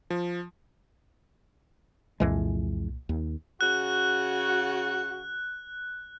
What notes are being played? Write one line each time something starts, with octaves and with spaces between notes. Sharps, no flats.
F3
C2 F2 A#2 E3 G#3
D#2
C#3 F#4 F#6